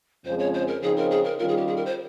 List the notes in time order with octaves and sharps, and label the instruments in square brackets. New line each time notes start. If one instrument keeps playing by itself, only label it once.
[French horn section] F2 C#3 F3 G#3 C4 [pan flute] C5
[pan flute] C#5
C5
A#4
[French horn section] C#3 F3 C4 D#4 [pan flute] G#4
[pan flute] A#4
G#4
A#4
[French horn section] D#3 G3 C#4 F4 [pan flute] A#4
[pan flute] G#4
G4
G#4
A#4
C5